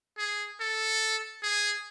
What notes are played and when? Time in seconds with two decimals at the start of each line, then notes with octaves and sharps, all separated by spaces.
0.18 G#4
0.60 A4
1.42 G#4